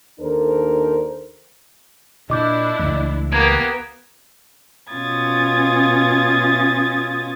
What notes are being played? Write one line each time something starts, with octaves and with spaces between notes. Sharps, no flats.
D#2 D4 A4 A#4 C5
A#2 D4 E4 D#5 D6 G6
C#2 E3 A3
A#3 B3 G4 G#6 D7
B2 C#4 F4 D#6 G#6 A6